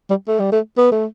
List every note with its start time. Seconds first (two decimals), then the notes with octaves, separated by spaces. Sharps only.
0.10 G3
0.28 A3
0.40 G3
0.52 A3
0.77 B3
0.92 A3